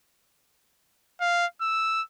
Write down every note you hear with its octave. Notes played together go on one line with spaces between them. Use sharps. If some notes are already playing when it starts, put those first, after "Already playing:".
F5
E6